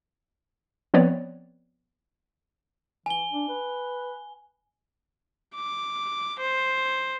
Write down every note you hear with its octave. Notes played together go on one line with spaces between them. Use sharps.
F3 B3 C4 B4 C#5 D5
E3 G#5 G7
D4
B4
D6
C5